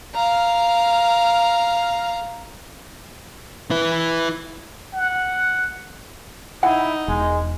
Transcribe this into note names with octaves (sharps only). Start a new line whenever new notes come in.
F5 A#5
E4 B4
F#5
D#4 E4 F#5
E1 G#3